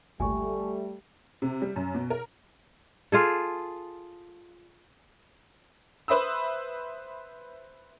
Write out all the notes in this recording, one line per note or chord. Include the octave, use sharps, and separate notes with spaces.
G#1 D2 A#2 G3 A3 G#5 C#6
C3
G3
F#2
B2
A#4
F4 G#4 A4
B4 C5 E5 B5 D#6 E6